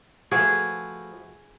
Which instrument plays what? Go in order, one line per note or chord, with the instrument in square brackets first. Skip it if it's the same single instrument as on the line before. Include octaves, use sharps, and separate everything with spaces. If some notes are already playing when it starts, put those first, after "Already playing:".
[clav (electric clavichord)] F3 A3 [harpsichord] F#4 B4 [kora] G#4